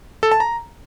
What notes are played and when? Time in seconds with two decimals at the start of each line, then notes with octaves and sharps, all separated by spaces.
0.23 A4
0.32 A5
0.40 A#5